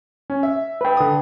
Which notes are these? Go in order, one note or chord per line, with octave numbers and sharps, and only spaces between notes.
C#4
E5
B4 G5
D3 D#6